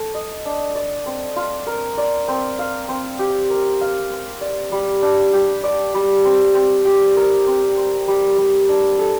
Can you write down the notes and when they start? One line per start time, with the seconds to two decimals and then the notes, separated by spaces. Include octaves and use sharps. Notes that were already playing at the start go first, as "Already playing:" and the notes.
Already playing: A4
0.14 D#5
0.45 D4
0.75 D5
1.06 C4
1.36 F4
1.67 A#4
1.98 D5
2.28 C4
2.59 F5
2.89 C4
3.19 G4
3.50 A#4
3.81 F5
4.11 C4
4.41 D5
4.72 G3
5.02 D4
5.33 G4
5.64 D5
5.94 G3
6.25 C4
6.54 C4
6.85 G4
7.16 A#4
7.46 C4
7.77 C4
8.08 G3
8.38 G3
8.69 D4
8.99 A4